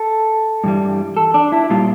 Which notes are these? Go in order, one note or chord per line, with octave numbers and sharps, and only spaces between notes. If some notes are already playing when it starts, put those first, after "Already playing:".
Already playing: A4
G2 E3 G3
A4
D4
E4
A#2 G3 F4